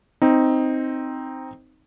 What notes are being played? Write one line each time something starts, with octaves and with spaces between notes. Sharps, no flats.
C4 D#4